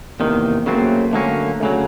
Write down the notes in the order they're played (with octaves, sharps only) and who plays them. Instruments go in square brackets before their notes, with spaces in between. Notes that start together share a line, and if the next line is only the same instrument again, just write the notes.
[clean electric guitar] E2 C3 D#3 [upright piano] A#3
[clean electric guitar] C#3 F#3 A3 C4 [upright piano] A#3
[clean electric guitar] D3 F#3 A#3 C#4 [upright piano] A3
[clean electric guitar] D2 C#3 F#3 [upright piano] A3